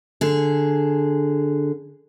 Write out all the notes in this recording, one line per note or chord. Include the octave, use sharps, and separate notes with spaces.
D3 G#4